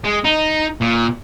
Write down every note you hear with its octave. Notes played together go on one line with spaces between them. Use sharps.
G#3
D#4
A#2